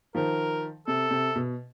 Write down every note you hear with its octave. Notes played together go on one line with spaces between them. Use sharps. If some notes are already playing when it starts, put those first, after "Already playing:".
D#3 F3 A#4
C3 A4
C3
B2